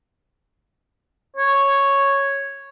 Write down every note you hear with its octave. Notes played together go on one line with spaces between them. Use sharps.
C#5